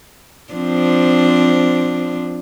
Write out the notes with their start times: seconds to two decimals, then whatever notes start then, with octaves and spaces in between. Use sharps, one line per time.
0.53 F3 C4 D4